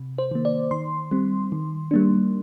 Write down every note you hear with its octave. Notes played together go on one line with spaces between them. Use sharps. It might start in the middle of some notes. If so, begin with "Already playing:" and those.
Already playing: C3
C5
D#3 A#3
D5
D#3 C6
G3 C4
D#3
G3 A#3 D4